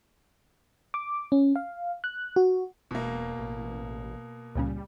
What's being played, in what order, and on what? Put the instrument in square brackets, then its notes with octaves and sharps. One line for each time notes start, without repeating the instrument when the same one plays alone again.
[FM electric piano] D6
C#4
F5
F#6
F#4
[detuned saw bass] E1 [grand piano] B2 A#3
[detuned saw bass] A1
[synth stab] C#2 A#2 C#3 [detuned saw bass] G3